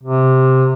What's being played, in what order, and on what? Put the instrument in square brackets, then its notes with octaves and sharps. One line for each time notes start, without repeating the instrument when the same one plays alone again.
[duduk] C3